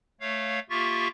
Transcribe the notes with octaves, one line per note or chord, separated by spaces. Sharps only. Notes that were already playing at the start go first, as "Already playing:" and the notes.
A3 C#5 F5
A#3 F4 G4 E5 C#6 A6